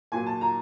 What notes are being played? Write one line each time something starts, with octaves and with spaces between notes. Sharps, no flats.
A#2 F#3 A#3 G#5
A5
A#5